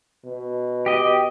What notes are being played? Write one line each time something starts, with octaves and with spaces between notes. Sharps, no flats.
B2
G4 D#5